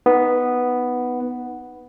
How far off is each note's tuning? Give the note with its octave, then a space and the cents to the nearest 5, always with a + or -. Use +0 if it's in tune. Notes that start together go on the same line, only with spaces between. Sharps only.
B3 +0 D#4 +0